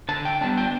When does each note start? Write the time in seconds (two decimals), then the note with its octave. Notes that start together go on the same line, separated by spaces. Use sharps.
0.09 D3 A5
0.25 G5
0.41 G3 B3 D4 A5
0.57 G5